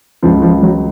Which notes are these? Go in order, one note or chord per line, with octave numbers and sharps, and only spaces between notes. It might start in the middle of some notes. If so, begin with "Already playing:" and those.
C#2 C#3 F3
F3
F#3